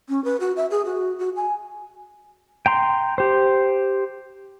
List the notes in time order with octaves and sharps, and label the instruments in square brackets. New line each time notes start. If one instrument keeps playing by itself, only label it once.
[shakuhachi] C#4
B4
F#4
E5
G#4
F#4
F#4
G#5
[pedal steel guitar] G5 A#5 C6
G4 C5